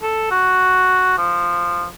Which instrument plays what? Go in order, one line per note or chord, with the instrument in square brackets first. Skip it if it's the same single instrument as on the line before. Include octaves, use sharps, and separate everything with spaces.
[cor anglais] A4
F#4
F3